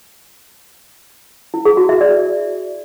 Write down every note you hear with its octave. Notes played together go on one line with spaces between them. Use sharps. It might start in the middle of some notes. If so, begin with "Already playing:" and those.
E4
G#4
F#4
E5
D5